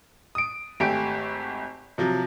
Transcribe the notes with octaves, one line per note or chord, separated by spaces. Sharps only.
D#6 D7
G#1 A3 G4 G#5 D7
C3 F3 F#3